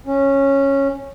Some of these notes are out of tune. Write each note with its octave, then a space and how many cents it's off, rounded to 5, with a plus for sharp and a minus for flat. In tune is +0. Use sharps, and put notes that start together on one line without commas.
C#4 -10